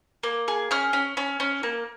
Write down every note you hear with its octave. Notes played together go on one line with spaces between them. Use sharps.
A#3
G#4
C#4 F6
C#4
C#4
C#4
A#3